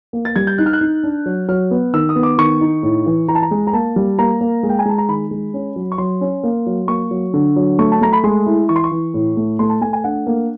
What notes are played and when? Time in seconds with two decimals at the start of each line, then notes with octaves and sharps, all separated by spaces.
0.13 A#3
0.25 A6
0.36 G3 G#6
0.47 G6
0.58 D#4 F#6
0.66 F6
0.73 F#6
0.81 D#4
1.04 D4
1.26 F#3
1.48 F#3 F6
1.71 B3
1.94 D#3 E6
2.09 D#6
2.16 B3
2.23 D6
2.38 D#3 C#6
2.61 D#4
2.83 A2
3.06 E3
3.28 E3 A#5
3.35 A5
3.42 A#5
3.51 G#3
3.67 A#5
3.73 A#3 A5
3.96 G3
4.19 A#3 A#5
4.41 A#3
4.63 G#3
4.69 G5
4.79 G#5
4.85 G#3 A5
4.98 A#5
5.08 D#3 B5
5.31 G#3
5.54 C#4
5.76 F#3
5.92 C#6
5.98 F#3 C6
6.21 C#4
6.43 A#3
6.66 F#3
6.88 A#3 C#6
7.11 F#3
7.34 D3
7.56 F#3
7.79 A3 C#6
7.92 A5
8.01 A3 A#5
8.13 B5
8.24 G#3 C6
8.46 E4
8.69 E3 C#6
8.76 C6
8.84 C#6
8.91 E3
9.14 A2
9.37 A3
9.59 A3 C6
9.70 A5
9.81 A3 G#5
9.93 G#5
10.04 D4 F#5
10.27 A#3